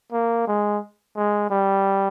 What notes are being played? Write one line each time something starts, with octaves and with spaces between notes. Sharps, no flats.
A#3
G#3
G#3
G3